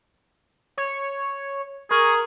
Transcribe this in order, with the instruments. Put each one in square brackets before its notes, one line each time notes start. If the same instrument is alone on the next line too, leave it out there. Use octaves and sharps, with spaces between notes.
[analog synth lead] C#5
[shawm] G#4 [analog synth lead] A#4 [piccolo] C#6